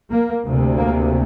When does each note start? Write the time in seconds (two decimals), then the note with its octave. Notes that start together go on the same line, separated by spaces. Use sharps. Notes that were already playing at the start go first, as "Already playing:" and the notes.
0.12 A#3
0.45 D2 C3
0.78 A#3